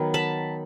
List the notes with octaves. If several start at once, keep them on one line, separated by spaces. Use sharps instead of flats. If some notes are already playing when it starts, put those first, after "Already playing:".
Already playing: D#3 F#3 B3
A5 B5